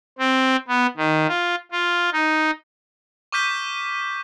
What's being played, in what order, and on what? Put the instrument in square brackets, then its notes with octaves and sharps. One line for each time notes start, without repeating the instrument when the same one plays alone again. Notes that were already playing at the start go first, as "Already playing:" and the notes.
[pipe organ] C4
B3
D#3
F4
F4
D#4
[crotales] C#6 D6 F6 G6 B6 D#7